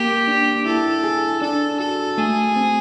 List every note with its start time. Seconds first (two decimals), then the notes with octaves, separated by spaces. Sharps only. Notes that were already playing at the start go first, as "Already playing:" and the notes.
Already playing: A#3 G4
0.28 D4
0.66 E4 A4
1.04 G#4
1.42 D4 A4
1.79 F#4 A4
2.18 A3 G#4
2.56 C4